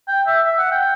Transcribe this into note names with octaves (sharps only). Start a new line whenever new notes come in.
G5
E5
E5
F#5
G5